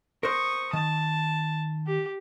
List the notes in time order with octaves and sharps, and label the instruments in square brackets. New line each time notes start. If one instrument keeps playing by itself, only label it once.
[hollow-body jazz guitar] A#4 C5 [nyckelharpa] C#6 D#6
[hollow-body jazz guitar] D#3 [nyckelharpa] A5
[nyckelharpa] G4